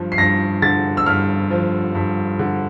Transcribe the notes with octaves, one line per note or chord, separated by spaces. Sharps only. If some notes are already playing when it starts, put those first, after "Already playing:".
Already playing: G2 F3
C7
G2 A#6
D3 A6
E6
G2 F6
F3
G2
D3